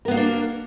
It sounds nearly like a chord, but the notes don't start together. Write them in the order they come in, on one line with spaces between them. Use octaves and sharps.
A#4 B3 A#3 F#4 D4